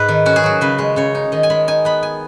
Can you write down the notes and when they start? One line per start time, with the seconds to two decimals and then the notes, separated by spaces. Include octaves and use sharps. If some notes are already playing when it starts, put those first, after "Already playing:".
Already playing: G#2 B4
0.08 D#3
0.26 C#4 F#4
0.36 G#4
0.43 F#3 F#4
0.61 C#3 B4
0.78 G#3
0.96 C#3 C#5
1.15 D#4
1.32 D#3 D#5
1.43 G#5
1.50 G#3 B5
1.68 D#4 G#5
1.85 B3 B5
2.03 G#5